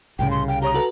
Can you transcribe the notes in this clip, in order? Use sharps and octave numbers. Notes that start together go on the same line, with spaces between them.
C2 A2 C#3 G5
C6
F5 G5
G4 C#5 A#5 D#6
F#4 A4 B4